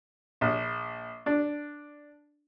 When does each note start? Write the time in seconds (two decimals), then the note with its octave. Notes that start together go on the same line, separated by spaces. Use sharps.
0.41 A#1
1.26 D4